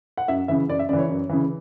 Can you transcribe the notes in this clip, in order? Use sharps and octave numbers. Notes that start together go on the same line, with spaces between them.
F#5
F#2 E5
C#3 E3 E5
F#2 D5
E5
C#3 E3 D5
C#5
F#2
C#3 E3